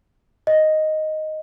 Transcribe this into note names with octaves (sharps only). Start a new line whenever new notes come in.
D#5